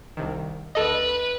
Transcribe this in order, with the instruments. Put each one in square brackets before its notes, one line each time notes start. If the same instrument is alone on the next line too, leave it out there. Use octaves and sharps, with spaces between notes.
[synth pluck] C2 C3 D#3
[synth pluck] D2 A4 D#5 [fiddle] B4